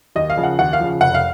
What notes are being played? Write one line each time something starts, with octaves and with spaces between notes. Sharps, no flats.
D#2 D#5
F5
C#3 F3
F#5
D#2 F#5
F5
C#3 F3
F1 F#5
F5